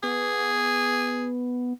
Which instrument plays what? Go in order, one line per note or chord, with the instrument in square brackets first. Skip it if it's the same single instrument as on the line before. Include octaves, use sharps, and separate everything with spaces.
[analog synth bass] B3 [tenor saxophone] G#4